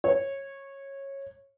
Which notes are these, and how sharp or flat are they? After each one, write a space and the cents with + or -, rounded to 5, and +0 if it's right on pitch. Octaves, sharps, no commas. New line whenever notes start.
C#5 -15